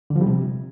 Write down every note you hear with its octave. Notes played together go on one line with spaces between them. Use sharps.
D3
F3
G3
C3